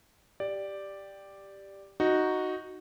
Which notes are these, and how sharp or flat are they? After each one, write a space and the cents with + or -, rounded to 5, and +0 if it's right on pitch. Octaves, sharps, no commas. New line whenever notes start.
G4 +0 D5 +0
D#4 +0 F#4 +0